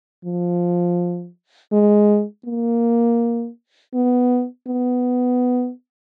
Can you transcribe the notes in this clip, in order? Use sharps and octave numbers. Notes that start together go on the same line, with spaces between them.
F3
G#3
A#3
B3
B3